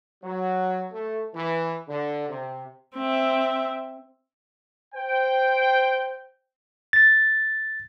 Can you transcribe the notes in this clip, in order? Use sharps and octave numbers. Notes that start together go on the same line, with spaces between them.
F#3
A3
E3
D3
C3
C4 E5
C5 G5
A6